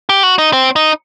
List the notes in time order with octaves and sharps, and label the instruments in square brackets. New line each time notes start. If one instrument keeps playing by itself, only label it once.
[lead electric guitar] G4
F#4
D#4
C4
D#4